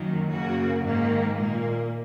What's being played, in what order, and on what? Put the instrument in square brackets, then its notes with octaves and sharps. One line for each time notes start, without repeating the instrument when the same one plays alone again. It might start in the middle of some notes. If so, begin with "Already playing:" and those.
Already playing: [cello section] F#2 D#3 F#3 A#3
F#2 C#3 A#3 F#4
G#2 D#3 A#3
A#2 A#3